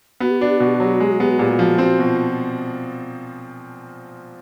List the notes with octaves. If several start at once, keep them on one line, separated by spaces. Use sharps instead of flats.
B3 F#4
G4
D4 F#4
G4
B2 F#4
G4
F#4
F#3 G4
F#4
G#3 G4
F#4
B3 G4
F#4
A#2 G4
F#4
F3
C4 F#4
B2
F4